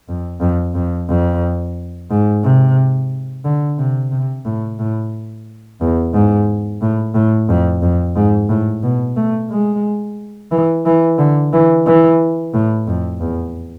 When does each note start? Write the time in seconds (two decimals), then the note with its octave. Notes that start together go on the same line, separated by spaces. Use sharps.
0.09 F2
0.41 F2
0.75 F2
1.09 F2
2.10 G#2
2.44 C3
3.45 D3
3.78 C3
4.12 C3
4.45 A2
4.79 A2
5.81 E2
6.13 G#2
6.81 A2
7.14 A2
7.49 F2
7.82 F2
8.16 G#2
8.49 A2
8.83 B2
9.16 A3
9.50 G#3
10.51 E3
10.85 E3
11.18 D3
11.53 E3
11.86 E3
12.54 A2
12.87 F2
13.21 E2